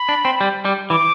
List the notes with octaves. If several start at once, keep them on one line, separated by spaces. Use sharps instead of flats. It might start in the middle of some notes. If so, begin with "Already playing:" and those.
Already playing: B5
D4
C4
G3
G3
E3 D6